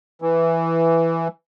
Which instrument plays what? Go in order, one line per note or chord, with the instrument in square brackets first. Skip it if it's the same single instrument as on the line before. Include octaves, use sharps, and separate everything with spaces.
[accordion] E3